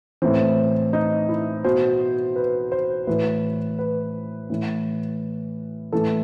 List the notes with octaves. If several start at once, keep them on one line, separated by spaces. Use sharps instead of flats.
A2 E3 C4
D#4
E4
B2 C5
B4
C5
A2 E3 B4
B4
A2 E3
A2 E3 A4